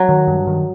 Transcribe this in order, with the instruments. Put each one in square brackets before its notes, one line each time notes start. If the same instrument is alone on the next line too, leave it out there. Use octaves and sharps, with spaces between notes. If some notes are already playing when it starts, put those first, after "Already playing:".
Already playing: [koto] F#3
[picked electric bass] D#3
G2
D#3